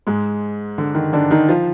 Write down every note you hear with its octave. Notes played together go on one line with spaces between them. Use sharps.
G#2 G#3
D3
D#3
D3 D4
D#3 D#4
F3 F4